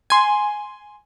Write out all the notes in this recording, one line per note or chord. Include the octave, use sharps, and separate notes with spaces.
G#5 C6